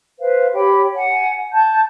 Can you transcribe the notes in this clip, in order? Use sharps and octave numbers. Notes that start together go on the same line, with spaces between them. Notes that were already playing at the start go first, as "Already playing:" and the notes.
B4 C5 F5
G4 C#5 G5 B5
F#5 G#5
A5 G6